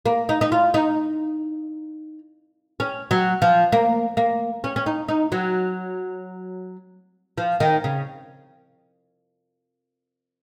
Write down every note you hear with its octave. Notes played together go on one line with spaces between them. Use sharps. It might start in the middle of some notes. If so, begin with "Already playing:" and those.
A#3
D#4
D#4
F4
D#4
C#4
F#3
F3
A#3
A#3
C#4
C#4
D#4
D#4
F#3
F3
D#3
C#3